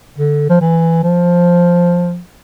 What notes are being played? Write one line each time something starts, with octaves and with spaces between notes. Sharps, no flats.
D3
F3
E3
F3